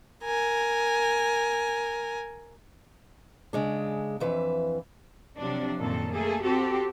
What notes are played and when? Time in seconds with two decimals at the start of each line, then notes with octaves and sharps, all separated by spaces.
0.24 A#4 G#5
3.53 C#3 G#3 D4
4.20 F2 E3 B4 E5
5.37 C3 F3 F#3 D4
5.78 F#2 A#2 D#3 C4 A4
6.13 A3 A#3 G#4 A4
6.43 C4 F#4 G4 A4